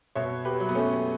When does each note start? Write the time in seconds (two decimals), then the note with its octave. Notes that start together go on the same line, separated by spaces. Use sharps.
0.15 B2 C#5 E5
0.45 G4 B4
0.60 F#3
0.69 B3
0.74 A3 C#4